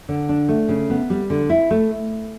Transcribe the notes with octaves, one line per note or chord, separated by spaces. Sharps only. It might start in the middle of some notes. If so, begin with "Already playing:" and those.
D3
D4
A3
C#3
B3
G3
D3
E4
A3